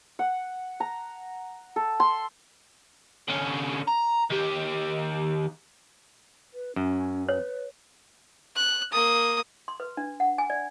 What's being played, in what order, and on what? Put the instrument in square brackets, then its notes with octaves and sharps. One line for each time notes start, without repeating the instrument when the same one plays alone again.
[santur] F#5
A#5
A4
C6
[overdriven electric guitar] D3 C#4
A#5
D#3 G4
[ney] B4
[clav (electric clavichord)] F#2 [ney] C#4
[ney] B4 [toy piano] C#5
[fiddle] F#6
A#3 D#6
[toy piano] C6
B4
D4
F#5
G#5
D5